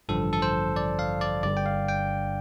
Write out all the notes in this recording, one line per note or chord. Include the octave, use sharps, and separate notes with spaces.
A1 G2 D3 F3 A4
A4
C5
D5
F5
D5
G1 G2 D3 D5
G5
F5
G5